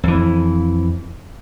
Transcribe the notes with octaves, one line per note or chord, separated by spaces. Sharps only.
F2 E3